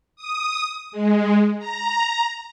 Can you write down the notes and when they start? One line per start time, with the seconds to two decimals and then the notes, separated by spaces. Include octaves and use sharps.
0.16 D#6
0.92 G#3
1.58 A#5